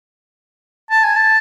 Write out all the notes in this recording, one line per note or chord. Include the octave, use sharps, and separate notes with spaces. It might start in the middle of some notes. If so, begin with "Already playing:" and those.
A5
G#5
A5